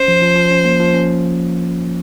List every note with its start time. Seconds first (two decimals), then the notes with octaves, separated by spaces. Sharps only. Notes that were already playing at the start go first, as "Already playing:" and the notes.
Already playing: C#4 C5
0.08 F3
0.22 F3
0.36 F3
0.51 C#4
0.65 A#3
0.79 F3
0.94 C#4